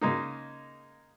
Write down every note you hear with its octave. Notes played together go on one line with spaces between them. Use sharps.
C#3 G#3 A#3 D#4